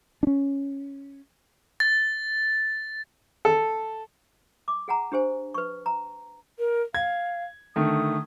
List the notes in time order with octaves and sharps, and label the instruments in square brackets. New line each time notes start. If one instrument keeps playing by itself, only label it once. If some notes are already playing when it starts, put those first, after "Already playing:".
[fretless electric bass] C#4 D4
[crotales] A6
[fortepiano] A4
[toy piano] D6
G#4 F#5 G#5 A#5
D4 G4 C5 G#5
B4 C#6
A#5
[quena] A#4
[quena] F5 [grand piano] G#6
[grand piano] D3 D#3 A3 [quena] D#6